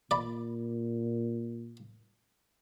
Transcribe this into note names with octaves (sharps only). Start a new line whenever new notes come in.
A#2 D5 B5